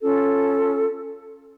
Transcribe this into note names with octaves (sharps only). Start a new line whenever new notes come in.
C#4 F4 A4